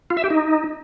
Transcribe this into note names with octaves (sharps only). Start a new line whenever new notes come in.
F4
E5
G4
D#4